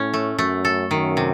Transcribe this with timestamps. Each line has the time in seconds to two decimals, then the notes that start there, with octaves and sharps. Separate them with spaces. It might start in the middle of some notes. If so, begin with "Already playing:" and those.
Already playing: A2 C#4
0.14 A3
0.39 F#2 A3
0.65 A4
0.91 F#2 D#3
1.17 C3